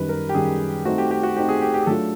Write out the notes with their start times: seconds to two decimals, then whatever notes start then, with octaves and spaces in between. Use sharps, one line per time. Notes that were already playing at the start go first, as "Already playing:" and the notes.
Already playing: F#2 D#3 G3 B4
0.09 A#4
0.29 G4
0.34 F#2 D#3 G3 G#4
0.85 A3 C4 D#4 F#4
0.98 G4
1.11 G4
1.23 F#4
1.36 A3 C4 D#4 G4
1.48 G#4
1.62 G4
1.74 G4
1.83 G#4
1.87 F#3 A3 D4 F4 A4